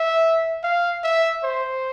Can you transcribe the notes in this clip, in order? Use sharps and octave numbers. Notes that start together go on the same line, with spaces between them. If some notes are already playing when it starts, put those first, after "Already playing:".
Already playing: E5
F5
E5
C5